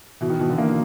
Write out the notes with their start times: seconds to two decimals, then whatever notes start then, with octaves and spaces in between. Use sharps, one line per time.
0.21 B2 E3
0.30 D#3
0.39 B2 E3
0.49 D3
0.58 A#3